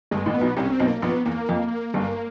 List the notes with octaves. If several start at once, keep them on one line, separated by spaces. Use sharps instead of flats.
G1 G2 G#3
A1 A2
B3
B1 B2
C2 C3 C#4
C4
B1 B2
A#3
A#1 A#2 B3
E2 A#3
F2
G1 G2